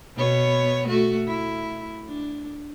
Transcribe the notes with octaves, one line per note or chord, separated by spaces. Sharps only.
B2 B3 C#5
A3 F#4
E4
D4